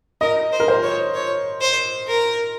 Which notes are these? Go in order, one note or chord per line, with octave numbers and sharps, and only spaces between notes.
A#4 D#5
C5
A#4
C5
C#5
C#5
C5
A#4